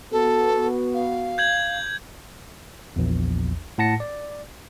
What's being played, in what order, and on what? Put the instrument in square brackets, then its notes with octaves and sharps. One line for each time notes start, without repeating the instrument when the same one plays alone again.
[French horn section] B3 F#4 [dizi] A4
[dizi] F5
[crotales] G6 G#6 F#7
[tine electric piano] A#1 E2
A2 F#5 A5 A#6 C#7
D5